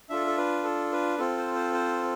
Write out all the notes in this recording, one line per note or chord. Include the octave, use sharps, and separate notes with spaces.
D4 F4 A4 E5
A4
B4
A4
B4
C4 F4 A4
C5
C5
C5